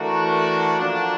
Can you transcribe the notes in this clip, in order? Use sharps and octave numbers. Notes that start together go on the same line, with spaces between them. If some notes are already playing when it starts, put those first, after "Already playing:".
Already playing: E3 A3 D4 F#4 A#4
F3 A#3 D4 F#4